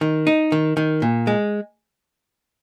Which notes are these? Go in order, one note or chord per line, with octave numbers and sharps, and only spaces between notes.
D#3
D#4
D#3
D#3
A#2
G#3